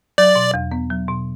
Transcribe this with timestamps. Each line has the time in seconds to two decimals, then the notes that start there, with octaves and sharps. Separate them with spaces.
0.18 F#3 D5
0.35 B2
0.54 E2
0.72 B3
0.91 F#3
1.08 B2